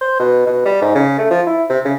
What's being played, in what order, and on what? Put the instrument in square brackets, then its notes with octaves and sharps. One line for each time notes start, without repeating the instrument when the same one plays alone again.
[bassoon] C5
B2
B2
G3
G#2
C#3
A3
F3
E4
C3
C#3